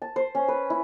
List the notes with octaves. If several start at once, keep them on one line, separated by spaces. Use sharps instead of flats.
A5
C5
C#4
B4
E4